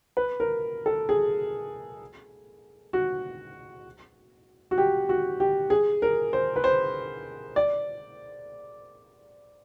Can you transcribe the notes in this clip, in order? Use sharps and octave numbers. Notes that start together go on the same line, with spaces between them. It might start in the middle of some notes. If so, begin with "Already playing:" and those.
B4
A#4
A4
G#4
F#4
F#4
G4
F#4
G4
G#4
A#4
C5
B4
C5
D5